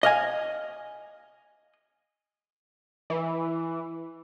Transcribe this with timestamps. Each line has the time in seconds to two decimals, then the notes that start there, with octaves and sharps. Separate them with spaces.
0.03 D#5 F5 G#5
3.10 E3